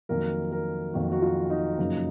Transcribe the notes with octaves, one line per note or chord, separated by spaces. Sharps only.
F2 D#3 F#3 A#3 A#4
A#4
F2 D#3 F#3 A#3 F#4
F#4
F4
D#4
F#2 C#3 F3 A#3 D#4